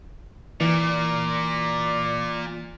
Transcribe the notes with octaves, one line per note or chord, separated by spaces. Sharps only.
A#2 E3 D5